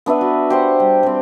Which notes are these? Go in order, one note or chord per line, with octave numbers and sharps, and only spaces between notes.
B3 D4 B4 E5
F#4
G4 C5 F#5
G3
G3 C4